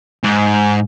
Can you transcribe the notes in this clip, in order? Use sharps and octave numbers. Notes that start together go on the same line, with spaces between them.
G#2